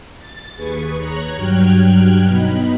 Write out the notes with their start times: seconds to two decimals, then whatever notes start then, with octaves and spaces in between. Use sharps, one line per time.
0.18 A6
0.55 D#2 G#4 B4 C#6
0.97 C#5 A#5 F#6 G#6
1.36 G2 F#3 G5 F6 F#6 G#6
2.25 B2 D#4 B5